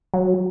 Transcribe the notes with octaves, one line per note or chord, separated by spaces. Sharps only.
F#3